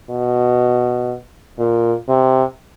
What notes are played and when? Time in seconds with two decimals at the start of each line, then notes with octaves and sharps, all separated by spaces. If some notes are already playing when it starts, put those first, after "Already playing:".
0.10 B2
1.59 A#2
2.09 C3